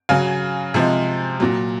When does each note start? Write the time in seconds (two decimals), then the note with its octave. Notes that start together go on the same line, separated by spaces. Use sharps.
0.09 C#3 F#3 F5 G#5
0.74 C3 F3 G#3
1.40 A#2 F#3